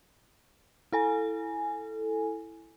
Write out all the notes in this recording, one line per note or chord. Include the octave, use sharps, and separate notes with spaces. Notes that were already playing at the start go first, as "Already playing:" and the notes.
E4 A4 G#5